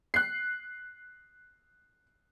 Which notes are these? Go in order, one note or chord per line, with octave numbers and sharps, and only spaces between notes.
F#6 C7